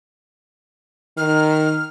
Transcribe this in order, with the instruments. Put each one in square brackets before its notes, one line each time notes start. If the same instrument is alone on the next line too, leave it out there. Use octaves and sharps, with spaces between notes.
[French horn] D#3 [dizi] F6